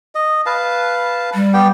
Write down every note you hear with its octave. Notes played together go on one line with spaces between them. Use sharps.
D#5
B4 F5 A5
G3
B3 G4 G5